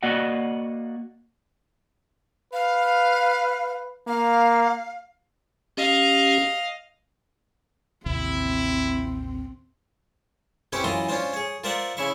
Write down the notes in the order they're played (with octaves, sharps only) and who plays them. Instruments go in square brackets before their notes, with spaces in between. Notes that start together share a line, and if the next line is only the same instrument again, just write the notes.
[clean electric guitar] A#3 F#4 D5 D#5 F#5
[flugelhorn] B4 [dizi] F5
[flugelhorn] A#3 [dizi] F5
[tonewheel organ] C#4 G4 [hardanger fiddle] D#5 F5
[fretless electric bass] A1 D#2 C3 [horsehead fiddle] C4 [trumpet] E4
[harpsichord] C4 C#4 E4 G4 B4 C#5
F#2 E3 F4 D#5 C6
C#4 D4 F4 C5
G#4 C#5
F4 A#4 C5 D5 E5 F#5
C#3 C#4 E4 E5 C#6